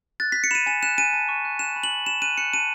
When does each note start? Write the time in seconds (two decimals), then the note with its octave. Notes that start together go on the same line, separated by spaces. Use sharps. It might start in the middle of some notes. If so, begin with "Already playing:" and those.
0.20 F#6 A6
0.32 B6
0.36 F#6
0.44 C#7
0.51 B5 D#7 E7
0.66 G#5 E7
0.82 F#6 E7
0.98 G#5 D#7
1.13 A5
1.29 C#6
1.45 F#6
1.59 F#6 E7
1.76 B5
1.83 F#7
1.91 F#6
2.06 B5 E7
2.22 F#6 D#7
2.38 F#6 C#7
2.53 A5 D#7